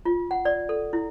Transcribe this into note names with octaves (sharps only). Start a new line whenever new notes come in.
F4
F#5
D5
A4
E4